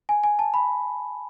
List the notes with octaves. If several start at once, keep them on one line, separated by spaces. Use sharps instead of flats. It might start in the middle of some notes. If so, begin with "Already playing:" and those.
G#5
G#5
A5
B5